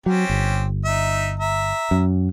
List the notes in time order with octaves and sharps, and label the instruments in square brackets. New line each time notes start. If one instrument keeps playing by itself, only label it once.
[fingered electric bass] F#3 [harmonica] C4 C#4 G4
[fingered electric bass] G1
[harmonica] D#4 E5
E5 A#5
[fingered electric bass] F#2